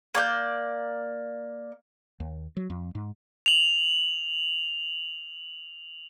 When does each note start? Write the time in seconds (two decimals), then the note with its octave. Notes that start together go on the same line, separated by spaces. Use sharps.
0.15 A#3 D5 G6
2.20 D#2
2.57 F#3
2.70 F2
2.95 G#2
3.46 F7 F#7